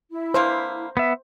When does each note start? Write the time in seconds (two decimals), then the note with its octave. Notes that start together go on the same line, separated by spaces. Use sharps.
0.11 E4
0.34 D3 E3 A#3 C5
0.97 B3 E5